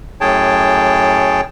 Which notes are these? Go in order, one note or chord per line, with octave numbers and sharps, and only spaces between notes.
F#2 A2 G#4 C#5 G5 A5